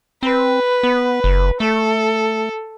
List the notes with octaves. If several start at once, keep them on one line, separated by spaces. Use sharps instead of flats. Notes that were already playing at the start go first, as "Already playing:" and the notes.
C4 B4
B3
F#1
A3 A4